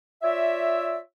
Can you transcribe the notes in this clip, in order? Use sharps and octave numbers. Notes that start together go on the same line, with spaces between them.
F4 C#5 D5 E5